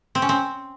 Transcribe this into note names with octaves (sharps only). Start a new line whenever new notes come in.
C4
C#4
C4